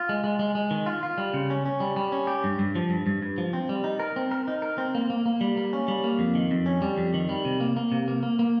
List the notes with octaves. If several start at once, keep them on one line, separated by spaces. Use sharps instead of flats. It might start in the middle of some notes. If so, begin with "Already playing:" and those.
Already playing: F4
G#3
G#3
G#3
G#3
D#3
F4
F4
G3
C#3
C#4
C#4
G3
G3
C#4
G4
G2
G2
F3
G2
G2
G2
F3
C4
G3
D#4
A#4
C4
A#4
D#4
A#4
C4
A#3
A#3
A#3
G3
A#3
C#4
G3
A#3
F2
D#3
F2
C#4
G3
F2
D#3
G3
C3
A#3
A#3
C3
A#3
A#3
A#3